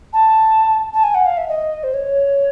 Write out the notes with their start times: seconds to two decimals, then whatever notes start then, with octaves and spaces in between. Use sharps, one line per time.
0.13 A5
0.94 A5
1.04 G#5
1.15 F#5
1.26 F5
1.37 E5
1.49 D#5
1.84 C5
1.94 C#5